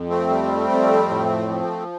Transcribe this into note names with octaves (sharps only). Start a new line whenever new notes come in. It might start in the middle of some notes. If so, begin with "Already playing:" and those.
Already playing: F2
A3 C4
G3
F2
A2
F3